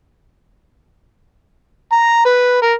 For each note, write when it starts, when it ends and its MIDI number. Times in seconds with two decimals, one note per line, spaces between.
1.92 2.23 82
2.25 2.59 71
2.62 2.74 70